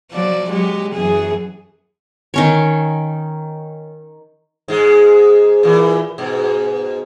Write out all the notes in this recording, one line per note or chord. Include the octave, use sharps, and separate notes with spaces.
F3 F#3 D5
F#3 G#3 G4
F#2 E3 G#4
D#3 C#4 C#5
G#2 G#3
A#2 E3
G#2 B2